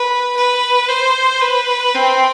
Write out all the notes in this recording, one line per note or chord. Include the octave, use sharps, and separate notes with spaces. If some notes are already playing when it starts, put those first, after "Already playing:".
Already playing: B4
B4
C5
B4
C4